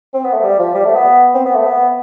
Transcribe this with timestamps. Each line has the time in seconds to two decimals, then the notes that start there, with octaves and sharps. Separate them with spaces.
0.14 C4
0.24 B3
0.34 A3
0.43 G3
0.59 F3
0.74 G3
0.84 A3
0.95 B3
1.34 C4
1.45 B3
1.55 A3
1.65 B3